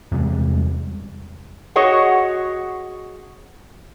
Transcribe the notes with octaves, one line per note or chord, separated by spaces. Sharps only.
E2 C3 G3 G#3
F#4 G#4 C#5 D#5 F#5